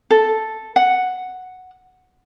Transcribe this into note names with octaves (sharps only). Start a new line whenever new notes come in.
A4
F#5